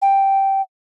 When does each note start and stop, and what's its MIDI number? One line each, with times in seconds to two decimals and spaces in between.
0.02 0.62 79